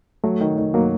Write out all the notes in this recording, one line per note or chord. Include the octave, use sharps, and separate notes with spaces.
F#3 A3
D#3
D#3
F#3 A#3